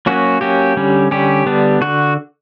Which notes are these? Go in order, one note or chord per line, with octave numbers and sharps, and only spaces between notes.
F#3 A#3 C#4 F#4
F#3 A#3 C#4 G4
D3 G3 C#4
D3 G3 C#4 G4
D3 G3 B3 D4
D3 F#4